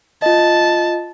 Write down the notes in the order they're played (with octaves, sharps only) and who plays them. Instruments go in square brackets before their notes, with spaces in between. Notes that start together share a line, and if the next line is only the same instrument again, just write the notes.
[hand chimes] F4 D#5 [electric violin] A5